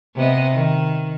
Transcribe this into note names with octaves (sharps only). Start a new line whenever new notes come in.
C3 B3 D#5
D#3